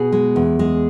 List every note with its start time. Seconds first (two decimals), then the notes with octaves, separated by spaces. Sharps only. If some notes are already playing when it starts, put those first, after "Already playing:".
Already playing: B2 G#4
0.12 G#3
0.36 E2
0.59 G#3